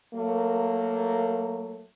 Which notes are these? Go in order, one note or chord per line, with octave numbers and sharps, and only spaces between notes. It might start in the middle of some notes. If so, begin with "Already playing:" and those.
F#3 A3 A#3